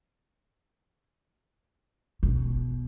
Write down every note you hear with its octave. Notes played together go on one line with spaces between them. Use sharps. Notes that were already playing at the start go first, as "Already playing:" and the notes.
B2